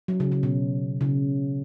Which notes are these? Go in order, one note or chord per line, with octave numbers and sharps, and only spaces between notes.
F#3
C#3
C#3
B2
C#3